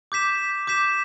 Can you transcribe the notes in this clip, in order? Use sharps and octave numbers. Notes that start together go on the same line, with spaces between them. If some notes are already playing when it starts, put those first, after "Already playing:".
D6 G6 B6 E7
D6 G6 B6 E7